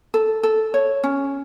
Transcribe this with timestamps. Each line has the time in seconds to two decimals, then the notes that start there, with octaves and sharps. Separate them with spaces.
0.14 A4
0.43 A4
0.74 C#5
1.04 C#4